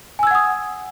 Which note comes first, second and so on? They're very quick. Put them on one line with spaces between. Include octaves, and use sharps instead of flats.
G#5 E6 G#6 F#5 D#6